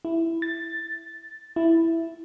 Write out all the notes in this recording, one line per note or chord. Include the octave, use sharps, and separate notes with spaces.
E4
A6
E4